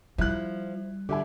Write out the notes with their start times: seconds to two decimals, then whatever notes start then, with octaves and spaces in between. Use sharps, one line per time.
0.18 F3 G3 E4 F#6
1.09 D3 G4 E5 G#5